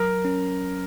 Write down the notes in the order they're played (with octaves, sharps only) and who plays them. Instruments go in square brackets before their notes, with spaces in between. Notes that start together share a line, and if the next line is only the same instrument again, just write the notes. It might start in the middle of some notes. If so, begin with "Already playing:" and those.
Already playing: [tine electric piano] F#3 [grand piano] A#4
[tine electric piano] C#4